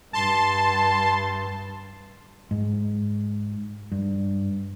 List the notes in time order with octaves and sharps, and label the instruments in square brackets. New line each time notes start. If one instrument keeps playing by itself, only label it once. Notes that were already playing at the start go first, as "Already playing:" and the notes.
[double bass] G2 [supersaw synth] A5 C6
[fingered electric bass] G#2
G2